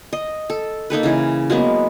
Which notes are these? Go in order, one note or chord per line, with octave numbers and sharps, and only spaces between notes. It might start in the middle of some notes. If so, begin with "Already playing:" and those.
D#5
A4
A#3 D#4 A4 B4
C#3 E3
F#3 G#3 A#3 B3